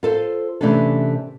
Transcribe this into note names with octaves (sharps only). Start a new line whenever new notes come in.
F4 A4 C5
C3 E3 A3 C#4 D4 A4